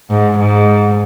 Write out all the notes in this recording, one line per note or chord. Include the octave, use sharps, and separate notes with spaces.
G#2
G#2